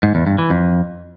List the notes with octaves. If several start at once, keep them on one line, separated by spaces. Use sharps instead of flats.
G#2
E2
G2
E3
F2